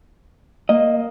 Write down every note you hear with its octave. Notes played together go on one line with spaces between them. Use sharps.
A#3 D#5